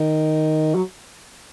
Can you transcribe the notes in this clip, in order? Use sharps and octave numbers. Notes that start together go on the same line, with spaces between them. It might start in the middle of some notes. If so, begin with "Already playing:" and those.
Already playing: D#3
F#3